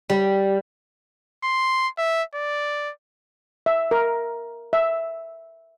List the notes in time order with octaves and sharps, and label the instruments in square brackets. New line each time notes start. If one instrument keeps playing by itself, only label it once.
[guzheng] G3
[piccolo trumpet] C6
E5
D5
[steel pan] E5
A#4
E5